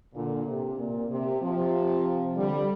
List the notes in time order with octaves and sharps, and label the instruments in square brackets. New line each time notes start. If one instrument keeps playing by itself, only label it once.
[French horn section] A#2 D3
C3
A#2
C3
C3 F3
D3 G3